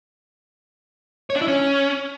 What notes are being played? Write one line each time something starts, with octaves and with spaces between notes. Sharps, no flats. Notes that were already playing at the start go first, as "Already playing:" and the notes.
C#5
D4
E4
C#4